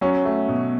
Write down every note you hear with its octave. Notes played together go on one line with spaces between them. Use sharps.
F#3 C#4
A3
B2